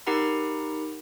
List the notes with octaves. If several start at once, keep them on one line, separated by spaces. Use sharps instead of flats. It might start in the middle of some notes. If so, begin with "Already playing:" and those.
D#4 G4 A#4 F#5 A#5 B5